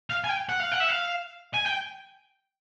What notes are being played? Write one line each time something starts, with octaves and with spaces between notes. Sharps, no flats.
F5
G#5
G5
F#5
F5
F#5
E5
F5
G#5
G5